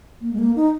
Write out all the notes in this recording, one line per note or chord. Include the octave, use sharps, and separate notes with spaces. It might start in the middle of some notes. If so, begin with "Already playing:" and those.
A#3
G#3
A#3
D#4